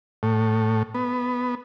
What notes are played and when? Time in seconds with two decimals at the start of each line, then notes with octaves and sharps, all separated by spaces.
0.23 A2
0.94 B3